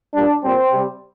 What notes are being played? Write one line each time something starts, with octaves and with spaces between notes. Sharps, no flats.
A#2 G3 D4
A#2 G3 C4
C3 G3